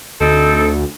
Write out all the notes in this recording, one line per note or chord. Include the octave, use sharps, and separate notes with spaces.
D2 C4 D#4 A4